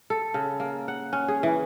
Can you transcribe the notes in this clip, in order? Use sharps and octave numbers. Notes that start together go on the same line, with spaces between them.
A4
C#3
A#3
F#5
C#4
G#4
E3